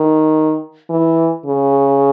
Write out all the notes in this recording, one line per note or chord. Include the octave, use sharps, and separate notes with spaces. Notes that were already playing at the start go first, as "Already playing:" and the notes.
Already playing: D#3
E3
C#3